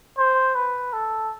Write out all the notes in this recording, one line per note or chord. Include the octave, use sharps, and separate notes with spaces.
C5
B4
A4